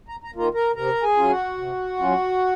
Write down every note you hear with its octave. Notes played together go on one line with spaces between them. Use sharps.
A#5
A#5
D#3 A#3 F4 A#5
A#4 A#5
C3 A#4 A#5
G#4 G#5
F#3 C#4 F4
F#4 F#5
C3
F#3 C#4 F4